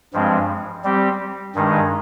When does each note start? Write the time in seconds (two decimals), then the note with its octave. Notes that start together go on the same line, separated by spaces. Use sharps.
0.13 G2 F3 G#3 C4
0.84 G3 C4 G4
1.55 G2 D#3 G#3 D#4